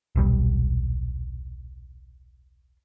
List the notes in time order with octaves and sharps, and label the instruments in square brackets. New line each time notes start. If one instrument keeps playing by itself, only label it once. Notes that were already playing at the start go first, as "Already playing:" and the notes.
[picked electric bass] D#1 B1 G3